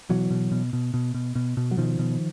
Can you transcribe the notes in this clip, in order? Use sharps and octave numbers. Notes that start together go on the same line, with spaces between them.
B2 E3 F#3
B2
B2
B2
B2
B2
B2
B2
F#3
B2 D#3 F3
B2